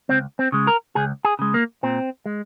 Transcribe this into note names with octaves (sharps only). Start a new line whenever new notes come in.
C#2 C4
C4
C#3 G#3
A#4
C#2 G#4
G#4
C#3 G#3
A#3
A#2 C4
G#3